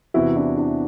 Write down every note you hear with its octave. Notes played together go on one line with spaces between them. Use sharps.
E2 C3 E3 E4 F#4
D4 E4
D4 E4